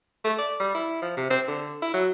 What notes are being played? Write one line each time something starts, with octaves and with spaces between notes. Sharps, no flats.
A3
D5
G3
E4
F3
C3
C4
D3
E4
F#3